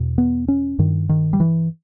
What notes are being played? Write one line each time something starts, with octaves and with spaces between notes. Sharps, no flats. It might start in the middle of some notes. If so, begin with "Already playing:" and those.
Already playing: E2 B2
B3
C#4
G2 D#3
D#3
G3
E3